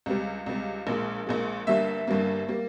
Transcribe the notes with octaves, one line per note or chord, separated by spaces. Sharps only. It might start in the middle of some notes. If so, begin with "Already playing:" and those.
C#2 C3 G3
C#2 C3 G3
A#1 A#2 G#3
A#1 A#2 G#3
G1 G2 G3 A#3 E5
G1 G2 G3 A#3
G3 A#3